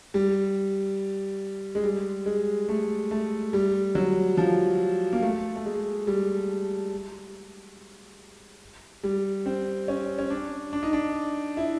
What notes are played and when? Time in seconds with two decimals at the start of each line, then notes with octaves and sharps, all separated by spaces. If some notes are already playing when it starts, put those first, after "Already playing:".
0.14 G3
1.75 G#3
1.84 G3
2.26 G#3
2.69 A3
3.11 A3
3.53 G3
3.95 F#3
4.37 F3
5.13 A#3
5.22 A3
5.56 A3
5.65 G#3
6.07 G3
9.04 G3
9.46 C4
9.88 C#4
10.19 C#4
10.30 D4
10.73 D4
10.83 D#4
10.93 D4
11.57 E4